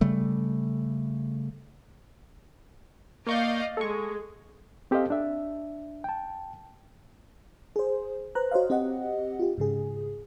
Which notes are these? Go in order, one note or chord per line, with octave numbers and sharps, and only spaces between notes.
C#3 G3 A3
A#3 D5 D#5 F5 C#6 G6
G#3 A4 C#6
C4 G4 A4 C5 D#5 F5
D4 E5
G5 A5
G#4 C5
B4 C5 A#5 F#6
F#4 C5 C#5 D#5 F5
C4 G4 D#5 F#5
F4 G4
G#2 C#3 G#4